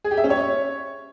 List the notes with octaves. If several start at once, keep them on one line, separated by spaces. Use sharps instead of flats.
G#4
G4
E5
C#4
C#5